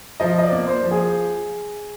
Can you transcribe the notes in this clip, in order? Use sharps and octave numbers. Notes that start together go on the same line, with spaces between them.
F3 D#5
D#5
D5
A#3
C5
F3
G#4